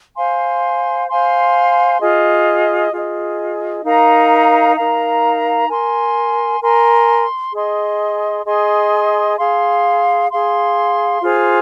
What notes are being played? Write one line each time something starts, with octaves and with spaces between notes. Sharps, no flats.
C5 F5 G#5 C6
C5 F5 G#5 C6
F4 G#4 D#5
F4 G#4 D#5
D#4 A#4 F5 A#5
D#4 A#4 F5 A#5
A#4 G#5 C6
A#4 G#5 C6
G#4 D#5 C6
G#4 D#5 C6
G#4 F5 C6
G#4 F5 C6
F4 G#4 C5